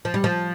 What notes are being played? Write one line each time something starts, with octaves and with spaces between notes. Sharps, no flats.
F3
G3
F3